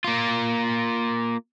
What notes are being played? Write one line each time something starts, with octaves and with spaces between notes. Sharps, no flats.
A#3 F4